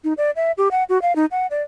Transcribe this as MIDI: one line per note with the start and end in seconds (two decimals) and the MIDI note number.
0.04 0.13 63
0.17 0.31 74
0.36 0.52 76
0.58 0.69 67
0.71 0.84 78
0.89 1.01 66
1.02 1.15 77
1.16 1.26 63
1.31 1.47 78
1.51 1.62 74